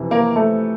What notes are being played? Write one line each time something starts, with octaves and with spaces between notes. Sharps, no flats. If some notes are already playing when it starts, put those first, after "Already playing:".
Already playing: F2 C3 E3
A#3 A#4
A3 A4